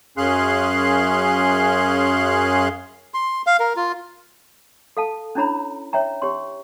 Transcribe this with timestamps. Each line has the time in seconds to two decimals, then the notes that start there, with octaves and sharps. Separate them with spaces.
0.17 F#2 C#4 G#4 F5 C6 F#6
3.14 C6
3.47 F5
3.60 A#4
3.77 F4
4.97 A4 F5 A5
5.35 C#4 D4 E4 C#5 A#5 B5
5.93 C#5 E5 G5 A#5
6.22 G4 C#5 C6